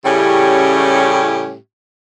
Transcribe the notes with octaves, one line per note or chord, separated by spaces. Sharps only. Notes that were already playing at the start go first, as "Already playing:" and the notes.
A2 C#3 G3 C#4 E4 G4